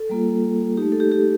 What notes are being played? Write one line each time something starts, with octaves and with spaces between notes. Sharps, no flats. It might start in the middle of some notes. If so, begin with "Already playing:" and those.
Already playing: A4
G3 A#3 F4
A3 D#4 G4
A4
G4
G4